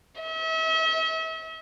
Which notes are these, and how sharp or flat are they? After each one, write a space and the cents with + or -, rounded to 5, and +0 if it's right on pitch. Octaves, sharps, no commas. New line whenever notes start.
E5 -40